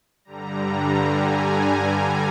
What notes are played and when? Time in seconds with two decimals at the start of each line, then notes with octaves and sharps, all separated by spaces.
0.25 G2 D3 G3 A#5
1.00 G#5